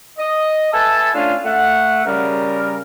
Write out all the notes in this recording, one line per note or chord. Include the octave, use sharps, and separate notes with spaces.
D#5
A4 B4 E5 G#5 A5
A3 C#4 D4 F4
A3 F#5
C#3 G3 A#4